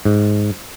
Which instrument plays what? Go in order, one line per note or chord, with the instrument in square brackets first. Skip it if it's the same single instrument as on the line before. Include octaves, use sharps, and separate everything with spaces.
[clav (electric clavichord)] G#2